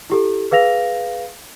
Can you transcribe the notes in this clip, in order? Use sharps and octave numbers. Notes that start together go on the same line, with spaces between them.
E4 G4 A4
G#4 B4 F5 A#6 F7